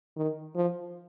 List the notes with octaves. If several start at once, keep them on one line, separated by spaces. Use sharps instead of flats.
D#3
F3